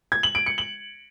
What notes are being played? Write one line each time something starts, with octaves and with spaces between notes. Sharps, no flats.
G#6
F#7
D7
C#7
F#7